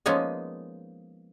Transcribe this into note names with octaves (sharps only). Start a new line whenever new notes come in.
F3 G#3 A#3 B3 C#4 D#4